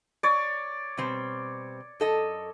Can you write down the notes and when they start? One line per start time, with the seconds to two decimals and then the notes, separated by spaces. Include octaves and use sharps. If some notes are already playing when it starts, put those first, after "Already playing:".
0.23 C#5 D5
0.97 B2 G3 C4
2.00 F#2 A4 D#5